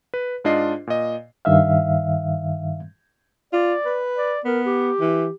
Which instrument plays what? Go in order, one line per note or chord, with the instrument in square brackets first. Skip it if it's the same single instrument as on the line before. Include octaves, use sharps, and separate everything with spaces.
[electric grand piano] B4
G#2 D4 F4 D#5 C7
A#2 D#5
[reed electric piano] G2 D#3 E5 F5
[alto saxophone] F4 [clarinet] D5
[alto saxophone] B4
[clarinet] D5
[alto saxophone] B3 [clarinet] A#4
[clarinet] G4
[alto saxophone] E3